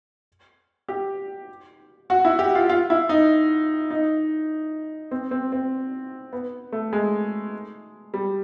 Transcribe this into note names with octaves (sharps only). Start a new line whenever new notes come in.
G4
F#4
E4
G4
F4
F4
E4
D#4
D#4
C4
C4
C4
B3
A3
G#3
G3